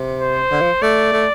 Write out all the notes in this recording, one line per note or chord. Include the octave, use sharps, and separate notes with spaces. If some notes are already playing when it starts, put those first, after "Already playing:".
Already playing: C3
C5
D3
F3
A3 D5
A3